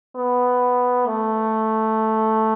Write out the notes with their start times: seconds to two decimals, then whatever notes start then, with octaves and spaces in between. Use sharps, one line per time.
0.16 B3
1.07 A3